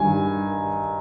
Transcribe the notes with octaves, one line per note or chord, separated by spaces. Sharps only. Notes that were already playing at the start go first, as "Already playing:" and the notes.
Already playing: G2 D#3 G#5